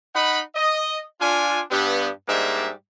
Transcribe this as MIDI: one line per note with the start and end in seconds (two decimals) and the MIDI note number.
0.15 0.40 63
0.15 0.40 78
0.15 0.40 83
0.55 1.00 75
1.21 1.61 62
1.21 1.61 65
1.21 1.61 80
1.71 2.08 43
1.71 2.08 59
2.28 2.70 44
2.28 2.70 55
2.28 2.70 56
2.28 2.70 58
2.28 2.70 62
2.28 2.70 76